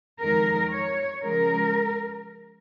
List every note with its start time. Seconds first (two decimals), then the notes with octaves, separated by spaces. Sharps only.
0.22 F2 D#3 G#3 A#4
0.72 C#5
1.22 C#3 F3 G#3 A#4